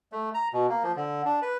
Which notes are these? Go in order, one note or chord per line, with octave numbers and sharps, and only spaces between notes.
A3
A#5
B2
A#3
F3
D3
D4
B4